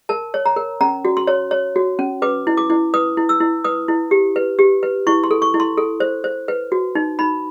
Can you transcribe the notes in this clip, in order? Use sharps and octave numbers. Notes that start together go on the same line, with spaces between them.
A#4 A5
C#5
A#5
A#4
C#4 A#5
F#4
C6
C#5
C#5
F#4
C#4
B4 D6
E4
D6
E4
B4 D#6
E4
E6
E4
B4 D#6
E4
G4
B4
G4
B4
E4 C#6
C6
A4
C#6
E4
C6
A4
C5
C5
B4
F#4
D#4
D#4 B5